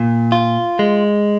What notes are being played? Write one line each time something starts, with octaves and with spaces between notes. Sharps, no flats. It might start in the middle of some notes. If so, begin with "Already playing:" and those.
Already playing: A#2
F4
G#3